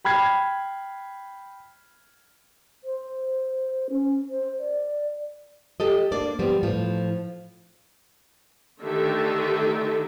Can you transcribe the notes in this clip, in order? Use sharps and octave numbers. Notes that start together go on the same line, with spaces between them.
G5 B5 F6 G#6 C7
C5
C#4
C5
D5
G4 A4 D#5
A#3 D4 D5
F3 G3 B3
A2 F3
D3 D#3 A3 G4 A4 E5